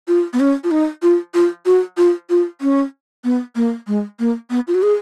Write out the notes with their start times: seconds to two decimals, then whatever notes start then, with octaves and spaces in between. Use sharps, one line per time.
0.08 F4
0.33 B3
0.40 C#4
0.64 F4
0.71 D#4
1.02 F4
1.34 F4
1.66 F#4
1.97 F4
2.30 F4
2.61 C#4
3.24 B3
3.55 A#3
3.87 G#3
4.19 A#3
4.50 B3
4.67 F4
4.74 F#4
4.82 G#4